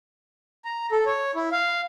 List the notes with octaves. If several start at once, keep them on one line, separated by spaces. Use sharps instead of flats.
A#5
A4
C#5
E4
F5